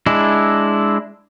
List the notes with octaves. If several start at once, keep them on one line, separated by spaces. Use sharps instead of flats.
G#3 D4 E4